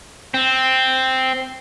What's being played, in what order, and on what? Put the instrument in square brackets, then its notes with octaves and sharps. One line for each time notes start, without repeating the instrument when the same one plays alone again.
[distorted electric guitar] C4